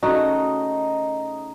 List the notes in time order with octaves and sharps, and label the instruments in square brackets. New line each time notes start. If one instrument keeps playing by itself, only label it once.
[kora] C#3 A3 F#4 [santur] D#4